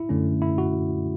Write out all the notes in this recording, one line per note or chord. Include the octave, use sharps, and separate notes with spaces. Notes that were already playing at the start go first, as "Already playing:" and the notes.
Already playing: E4
F#2 D3 A3 C#4
E4
F#4